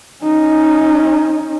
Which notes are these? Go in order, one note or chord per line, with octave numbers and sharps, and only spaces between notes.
C#4 D#4